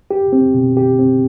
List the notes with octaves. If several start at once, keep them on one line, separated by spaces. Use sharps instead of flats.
G4
C4
B2
G4
C4